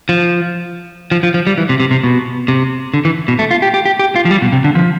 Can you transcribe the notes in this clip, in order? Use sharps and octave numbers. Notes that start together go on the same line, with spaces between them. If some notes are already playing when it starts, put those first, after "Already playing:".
F3
F3
F3
F3
G3
E3
C3
C3
C3
B2
C3
D3
E3
B2
A3
F4
G4
G4
G4
G4
F4
F3
G3
B2
C3
D3
F3